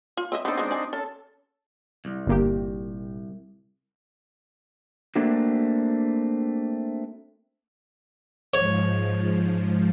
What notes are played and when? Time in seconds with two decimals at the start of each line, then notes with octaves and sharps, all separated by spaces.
0.17 F4
0.32 C4 D#5 E5
0.45 B3 C4 D4 D#4 A4
0.58 G#3 B3
0.71 D5 G#5
0.93 C#4 A4
2.05 C2
2.27 G1 A#2 G4
5.16 A3 A#3 C4 D4 F#4
8.54 G#2 F3 C#5